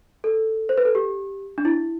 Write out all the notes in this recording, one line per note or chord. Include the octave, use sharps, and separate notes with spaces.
A4
C5
B4
A4
G4
D4
E4